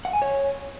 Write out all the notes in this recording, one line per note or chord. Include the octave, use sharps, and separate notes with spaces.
F#5
G#5
C#5